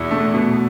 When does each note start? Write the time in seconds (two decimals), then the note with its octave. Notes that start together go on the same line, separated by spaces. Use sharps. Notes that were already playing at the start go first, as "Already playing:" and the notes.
Already playing: E2 B2 E4
0.11 A3
0.34 B2